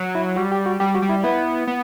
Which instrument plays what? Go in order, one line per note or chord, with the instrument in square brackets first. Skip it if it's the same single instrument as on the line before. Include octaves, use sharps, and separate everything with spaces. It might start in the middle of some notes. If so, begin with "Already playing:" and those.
Already playing: [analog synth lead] F#3
[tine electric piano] E4
[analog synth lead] G3 [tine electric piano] F#4
[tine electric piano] G4
F#4
[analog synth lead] G3 [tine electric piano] G4
[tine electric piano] F#4
[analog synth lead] G3
[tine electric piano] E4
[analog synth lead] B3 [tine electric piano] E4
[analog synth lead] B3